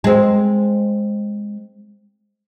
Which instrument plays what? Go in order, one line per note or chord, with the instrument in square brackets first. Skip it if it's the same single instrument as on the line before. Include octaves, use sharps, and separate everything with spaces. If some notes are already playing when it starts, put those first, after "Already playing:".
[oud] G#3 C4